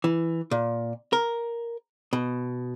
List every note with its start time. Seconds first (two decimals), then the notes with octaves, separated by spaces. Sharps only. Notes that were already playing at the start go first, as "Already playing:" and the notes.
0.04 E3
0.51 A#2
1.13 A#4
2.13 B2